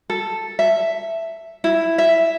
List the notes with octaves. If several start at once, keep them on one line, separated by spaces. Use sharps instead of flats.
A4
E5
E4
E5